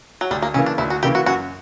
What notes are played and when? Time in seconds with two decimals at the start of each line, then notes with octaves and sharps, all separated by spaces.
0.21 F#3
0.31 D2 G3
0.42 A#3
0.54 C#3 E3 A#3 C#4
0.66 D4
0.78 D2 E4
0.90 F#4
1.03 C#3 E3 A#3 G4
1.15 F#4
1.26 F#2 F#4